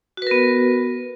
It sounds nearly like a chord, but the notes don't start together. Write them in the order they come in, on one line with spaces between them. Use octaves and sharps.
F#4 B4 A#4 B3